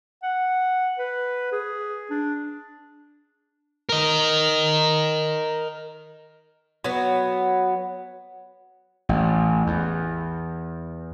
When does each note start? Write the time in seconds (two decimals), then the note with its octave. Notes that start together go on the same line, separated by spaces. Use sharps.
0.23 F#5
0.98 B4
1.52 G#4
2.10 D4
3.89 A#4 D#5
6.84 F#3 B3
9.09 A1
9.67 E2